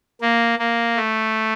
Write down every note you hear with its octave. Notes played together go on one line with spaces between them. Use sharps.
A#3
A#3
A3